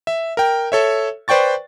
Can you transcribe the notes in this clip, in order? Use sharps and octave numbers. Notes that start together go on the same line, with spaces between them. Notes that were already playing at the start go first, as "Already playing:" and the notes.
E5
A#4 G5
A4 C#5 E5
B4 C5 D5 G5 C#6 A6